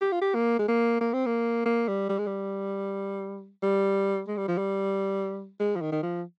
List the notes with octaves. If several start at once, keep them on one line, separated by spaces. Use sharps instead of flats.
G4
F4
G4
A#3
G#3
A#3
A#3
C4
A#3
A#3
G3
G3
G#3
G3
G3
G#3
G3
F3
G3
G#3
F3
D#3
D#3
F3